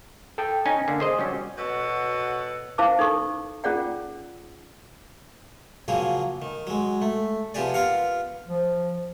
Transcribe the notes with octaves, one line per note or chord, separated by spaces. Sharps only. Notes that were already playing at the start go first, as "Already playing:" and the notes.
A4 G5
C#4 D#4 G#5
D3 A#3
G#4 C5 D#5
F#3 G3 C#4
B2 F#4 A4 C#5 F#5
C#4 E4 C5 F5 A5 D6
D#4 A4 C#6
C#4 F4 G#4 D5 F#5 G5
C#3 F3 F#3 A#3 G#4
D#3
F#3 G#3
A3
C3 F3 B3 G4 G#4 D5
B3 F4 A#4 F5 F#5
F3